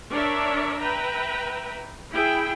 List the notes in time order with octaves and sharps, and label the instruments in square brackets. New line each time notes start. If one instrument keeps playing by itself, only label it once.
[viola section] D4 A#4 C#5 D5 E5
B4 E5 G5 A#5
E4 G#4 G5